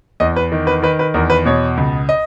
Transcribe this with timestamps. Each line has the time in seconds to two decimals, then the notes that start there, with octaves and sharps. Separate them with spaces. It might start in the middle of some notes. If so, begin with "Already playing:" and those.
0.20 E2 D#5
0.36 B4
0.52 D#3
0.67 B4
0.82 D#3 B4
0.99 B4
1.14 E2 A#4
1.30 B4
1.45 B2 C#5
1.77 C#2
2.09 D#5